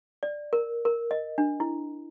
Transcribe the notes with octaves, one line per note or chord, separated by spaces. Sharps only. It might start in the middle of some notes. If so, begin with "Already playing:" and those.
D5
A#4
A#4
D#5
D4
E4